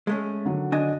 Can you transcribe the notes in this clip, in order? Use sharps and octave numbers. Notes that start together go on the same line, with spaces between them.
G#3 A3 C#4
D3 D#3 F#3
D4 D#5 G#5